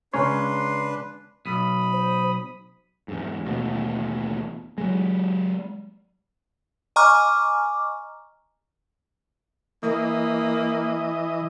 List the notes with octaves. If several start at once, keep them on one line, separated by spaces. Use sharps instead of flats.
C#3 G#3 C#4 D4 B4 C#5 A#5 C6
B1 B5 D#6
C5
E2 G#2
A1 D#2 B2
F#3 G#3
D#5 G#5 A#5 C#6 D6 F6
E3 A#3 D#5